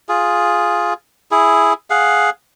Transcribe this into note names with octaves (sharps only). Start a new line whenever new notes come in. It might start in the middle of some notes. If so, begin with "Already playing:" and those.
F4 G#4
E4 G#4
G#4 F5 F#5